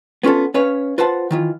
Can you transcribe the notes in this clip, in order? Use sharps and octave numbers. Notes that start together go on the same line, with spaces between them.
B3 C#4 F4 G4 A4
C#4 B4 C#5 F5
F4 B4 C5 F#5 A5
D#3 E3 F4